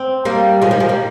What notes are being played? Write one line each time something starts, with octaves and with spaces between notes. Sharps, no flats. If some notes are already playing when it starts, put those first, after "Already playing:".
Already playing: C4
G3 A#3
F3 G#3
D#3 G3
F3 G#3
G3 A#3